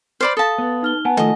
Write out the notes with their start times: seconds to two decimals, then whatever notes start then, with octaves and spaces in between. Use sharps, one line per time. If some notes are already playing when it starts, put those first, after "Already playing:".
0.21 C5 D5 B5 F6
0.37 A4 F5 A5 D#6
0.58 B3
0.82 D#4 F6 G7
1.05 B3 F#5 G#5 A5
1.17 D#3 F3 A3 D#5 D#6